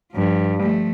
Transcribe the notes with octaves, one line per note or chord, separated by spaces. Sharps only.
G2 F3
F3 A3